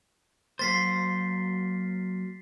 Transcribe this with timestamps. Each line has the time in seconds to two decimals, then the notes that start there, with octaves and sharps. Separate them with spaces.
0.59 F#3 A#3 C5 A6 B6 C7